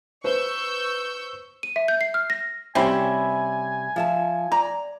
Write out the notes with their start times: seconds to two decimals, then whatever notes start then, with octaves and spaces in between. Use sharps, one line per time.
0.24 B4 C5 C#6 E6 G6
1.63 D#7
1.76 E5
1.88 G6
2.01 C7
2.14 F6
2.30 A#6
2.75 C3 G3 C4 C#4 E4 G4 G#5
3.96 F3 E5 A5
4.52 D5 A#5